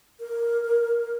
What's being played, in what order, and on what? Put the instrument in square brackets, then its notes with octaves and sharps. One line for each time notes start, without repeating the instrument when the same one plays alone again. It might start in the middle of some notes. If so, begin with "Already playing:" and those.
[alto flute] A#4